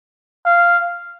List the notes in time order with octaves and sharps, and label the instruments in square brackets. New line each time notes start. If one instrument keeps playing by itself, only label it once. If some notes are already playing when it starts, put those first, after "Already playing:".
[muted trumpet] F5